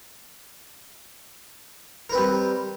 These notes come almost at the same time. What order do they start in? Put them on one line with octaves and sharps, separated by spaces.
A#4 B4 C4 G3